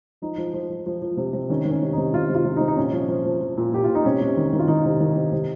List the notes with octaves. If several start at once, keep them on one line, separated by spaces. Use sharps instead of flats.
F3 D#4
F3
F3
F3
F3
F3
C3
C3
D#3 C#4
D#3
C#4
C3
C3 D#4
C3 F4
C3
F4
C3
D#4
C3
D#4
A#2 C#4
F3
F3
F3
F3
A#2
A#2 G4
A#2 F4
D#4
C3 C#4
C3
D#3
D#3
F4
D#3 D#4
C3
D#3
C3
C3